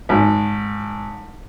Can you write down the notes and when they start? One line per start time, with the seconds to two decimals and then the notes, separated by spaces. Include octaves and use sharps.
0.09 G#1